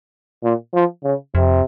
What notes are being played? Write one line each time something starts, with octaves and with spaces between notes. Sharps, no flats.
A#2
F3
C#3
F2 C3